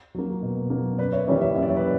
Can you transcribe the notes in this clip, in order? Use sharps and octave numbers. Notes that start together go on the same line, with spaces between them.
F#3 A#3
B2
F#3 A#3
F#2 B4 D5
C#5 E5
E3 G3 A#3 C#5 E5
C#5 E5
F#2 E5
D5
C#5
B4 D5